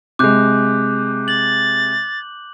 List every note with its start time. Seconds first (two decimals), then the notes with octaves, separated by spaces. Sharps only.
0.19 C3 G#3 D6 F#6 G6
1.28 A6 F#7